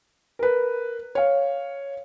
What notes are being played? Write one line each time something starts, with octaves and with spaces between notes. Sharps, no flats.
A#4 B4
C#5 F5